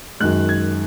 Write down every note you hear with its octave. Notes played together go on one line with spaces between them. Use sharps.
F#2 D#3 G#3 F#6
G#6